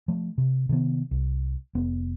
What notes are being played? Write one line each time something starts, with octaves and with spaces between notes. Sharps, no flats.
F3 A3
C3
C3 D#3 F#3 B3
C2
F1 B3